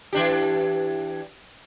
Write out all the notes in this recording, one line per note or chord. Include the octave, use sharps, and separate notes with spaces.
E3 D4 G4